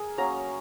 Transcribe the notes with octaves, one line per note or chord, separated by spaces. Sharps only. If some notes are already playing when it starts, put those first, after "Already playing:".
Already playing: G#4 A#4
F#3 A#3 C#4 A#5